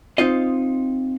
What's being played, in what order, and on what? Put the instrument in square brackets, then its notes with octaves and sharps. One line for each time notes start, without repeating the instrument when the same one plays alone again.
[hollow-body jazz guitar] C4 D#4 F4 D#5